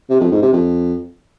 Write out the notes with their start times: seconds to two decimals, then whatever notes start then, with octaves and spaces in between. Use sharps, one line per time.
0.10 C3
0.21 F2
0.31 G#2
0.42 C3
0.53 F2